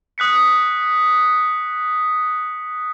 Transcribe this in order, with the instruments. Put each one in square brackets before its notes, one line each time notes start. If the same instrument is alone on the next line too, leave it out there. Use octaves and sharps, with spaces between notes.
[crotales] D#6 F#6 B6 C#7